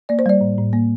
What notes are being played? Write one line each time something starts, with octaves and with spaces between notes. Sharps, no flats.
A#3 D5
C5
G3 D5
A2
A2
A#3